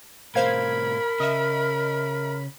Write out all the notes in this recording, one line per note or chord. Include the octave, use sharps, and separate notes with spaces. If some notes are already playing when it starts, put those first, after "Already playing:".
A2 C3 A#4 C5 F5 B5 G#6
C#3 D#5 E5